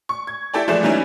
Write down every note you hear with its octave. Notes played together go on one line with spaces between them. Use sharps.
C#6
G#6
E4 G4 A4 D5
E3 F3 G#3 A3 D5 E7
E3 F#3 G3 C#4 D#4 E4